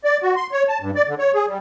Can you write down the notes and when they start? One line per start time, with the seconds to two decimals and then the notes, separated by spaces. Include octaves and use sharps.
0.04 D5
0.22 F#4
0.36 C6
0.52 C#5
0.68 A5
0.81 G2
0.95 D5
1.07 D3
1.19 C#5
1.34 G#4
1.47 G3